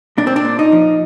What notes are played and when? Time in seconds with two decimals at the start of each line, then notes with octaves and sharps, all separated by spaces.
0.18 A#2 D4
0.27 C4
0.36 D4
0.45 A#2
0.59 D#4
0.72 F3